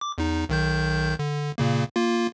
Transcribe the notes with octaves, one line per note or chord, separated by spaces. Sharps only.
D6
E2 D#4
B1 D#3 G6
D3
A#2 C#3 A#3
A#3 F4